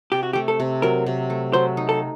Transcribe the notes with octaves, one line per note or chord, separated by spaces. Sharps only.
C3 G4
F#4
A3 G4
A4
C3
F#3 A#4
C3
A3
F#3 C5
D#4
A4